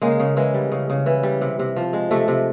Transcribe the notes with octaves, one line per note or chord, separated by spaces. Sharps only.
C#3 G#3 A#3
C#3
E3 G#3
G3
C#3
C#3
E3
G3
C3
C3
F3
G#3
C3 A3
C3